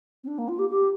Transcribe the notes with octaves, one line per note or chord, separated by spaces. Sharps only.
C4
D4
A#3
F4
G4
G4